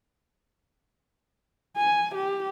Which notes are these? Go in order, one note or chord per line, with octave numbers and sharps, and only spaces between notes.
G#5
G4